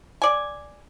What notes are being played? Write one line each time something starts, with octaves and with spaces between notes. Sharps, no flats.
D5 G#5